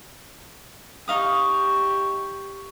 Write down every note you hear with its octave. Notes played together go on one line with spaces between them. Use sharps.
D#4 G4 F5 C#6 D#6